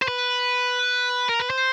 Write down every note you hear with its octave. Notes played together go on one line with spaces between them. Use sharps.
C5
B4
A#4
B4
C5